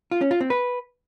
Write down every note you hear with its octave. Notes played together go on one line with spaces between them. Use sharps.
F4
C#4
F4
C4
B4